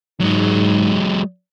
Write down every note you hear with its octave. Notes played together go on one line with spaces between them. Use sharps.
G#2 F#3 G#3